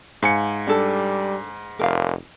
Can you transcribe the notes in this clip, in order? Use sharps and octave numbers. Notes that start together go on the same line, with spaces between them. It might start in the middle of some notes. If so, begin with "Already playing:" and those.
G#2 C5 F5 G#5 C#7
G3 D4 A4 A5
F1 A#4 F5